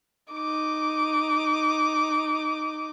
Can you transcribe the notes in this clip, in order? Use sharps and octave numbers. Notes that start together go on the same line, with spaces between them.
D#4 D6